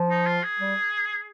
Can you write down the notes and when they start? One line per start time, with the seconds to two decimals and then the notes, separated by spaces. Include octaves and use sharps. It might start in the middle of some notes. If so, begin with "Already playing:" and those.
Already playing: F3
0.10 D#4
0.26 F4
0.43 G#4
0.59 G3